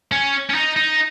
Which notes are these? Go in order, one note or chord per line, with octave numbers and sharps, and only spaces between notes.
C#4
C#4
D#4
D#4